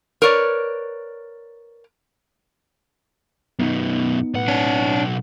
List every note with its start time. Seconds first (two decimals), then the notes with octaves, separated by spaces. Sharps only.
0.22 A#4 B4 C#5 D5
3.59 F#2 B2 B3 D#4
4.34 B1 A2 B4 F#5 F#6
4.48 D4 C#5